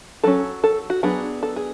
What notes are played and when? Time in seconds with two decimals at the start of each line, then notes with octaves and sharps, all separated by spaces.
0.23 F#3 C#4 A4
0.64 A4
0.90 F#4
1.03 F#3 B3 D4 G#4
1.43 A4
1.56 G#4